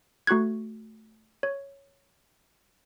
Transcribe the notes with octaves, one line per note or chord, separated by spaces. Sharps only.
A3 F#4 C#6 F#6 G#6
C#5